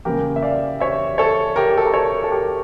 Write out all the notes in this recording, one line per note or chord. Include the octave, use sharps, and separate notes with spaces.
E2 C#3 G3 A#3 G4 A#4
E5
D5 F5
C#5 E5
A4 C#5
G4 A#4
G4
A4
A#4
A4 C#5
A4
G4 A#4